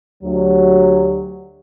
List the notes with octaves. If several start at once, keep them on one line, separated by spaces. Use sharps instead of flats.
D2 F#3 G4